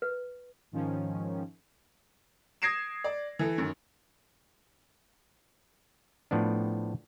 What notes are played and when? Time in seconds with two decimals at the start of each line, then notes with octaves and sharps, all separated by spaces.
0.02 B4
0.72 G#2 D#3 F3 C#4
2.62 D#6 G#6 A#6 C7 D7 E7
3.04 D5
3.39 E3 A4
3.58 F#2 D#3
6.31 A2 F3 B3 D4